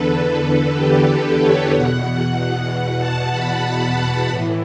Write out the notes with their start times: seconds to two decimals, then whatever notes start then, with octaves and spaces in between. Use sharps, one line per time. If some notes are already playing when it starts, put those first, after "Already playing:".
Already playing: E2 D3 A4 B4
0.42 A4
0.74 G4
1.06 B4
1.39 C#5
1.71 E2 B2 F#5
2.99 A5
3.31 B5
3.64 A5
4.29 A2 E3